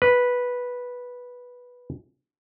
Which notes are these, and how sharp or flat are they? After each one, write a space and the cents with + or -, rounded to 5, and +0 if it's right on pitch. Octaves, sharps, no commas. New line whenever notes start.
B4 -10